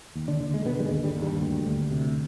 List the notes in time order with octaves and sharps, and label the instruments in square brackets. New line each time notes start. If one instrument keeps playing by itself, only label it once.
[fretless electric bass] D#2
D3 D4
D3
G#3
B2 D3 B3
G3
G#2 G#3
D#2
G2 G3
D#2
G2 G3
D2
D2
C3